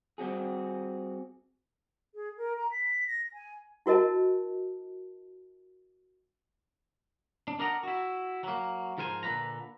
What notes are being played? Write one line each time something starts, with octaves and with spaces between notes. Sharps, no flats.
G3 C4 F#4 G#4
G#4
A#4
A#5
B6
A#6
G#5
E4 F#4 A#4 D#5 A5
D4
D4 A#4 D5 D#5 F#5 A#5
E4 F#4
F#3 A#3
G#2 F3 A#4 C5 G#5
A#2 D3 B4 A#5